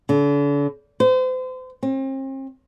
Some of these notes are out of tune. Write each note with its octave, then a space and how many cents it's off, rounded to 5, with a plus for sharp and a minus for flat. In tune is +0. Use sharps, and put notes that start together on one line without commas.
D3 -40
C5 -35
C4 +40